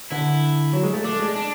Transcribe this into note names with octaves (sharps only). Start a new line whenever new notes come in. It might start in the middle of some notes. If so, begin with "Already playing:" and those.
D3 E4
F#3
G#3
A3
A3 D4
G#3
D4